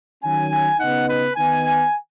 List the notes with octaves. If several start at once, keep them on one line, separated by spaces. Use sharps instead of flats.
D#3 F#3 C#4 G#5
C#3 B3 D#4 F#5
B4
D#3 B3 D#4 G#5